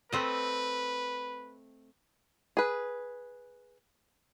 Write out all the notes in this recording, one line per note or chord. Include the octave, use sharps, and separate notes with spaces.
A3 C4 B4 D#5
G#4 B4